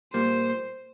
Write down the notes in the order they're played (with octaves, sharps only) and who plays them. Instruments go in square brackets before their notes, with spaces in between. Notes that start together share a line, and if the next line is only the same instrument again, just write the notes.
[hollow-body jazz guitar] A#2 G3 A#3 [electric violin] C5